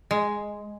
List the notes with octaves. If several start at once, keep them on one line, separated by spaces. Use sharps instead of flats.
G#3